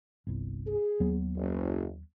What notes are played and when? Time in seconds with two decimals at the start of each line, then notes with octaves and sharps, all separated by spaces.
0.27 G1 C2
0.67 G#4
1.00 D#2 F#3 B3
1.36 F#1